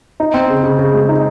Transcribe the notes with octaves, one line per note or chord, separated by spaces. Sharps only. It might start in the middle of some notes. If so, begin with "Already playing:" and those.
D#4
C4
C#3
C#3
C#3
G#3
D#4